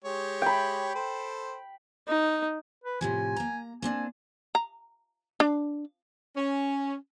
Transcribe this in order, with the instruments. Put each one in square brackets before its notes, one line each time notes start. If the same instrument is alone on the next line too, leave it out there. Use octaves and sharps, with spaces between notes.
[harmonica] G#3 G4 C#5
[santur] G5 B5
[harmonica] A4 C5
[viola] D#4
[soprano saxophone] B4
[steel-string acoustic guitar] A2 C3 F3 [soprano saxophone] G#5
[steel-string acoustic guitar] A#3 A#5
[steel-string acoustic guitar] A#3 C4 D4 [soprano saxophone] G#5
[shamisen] A#5
D4
[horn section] C#4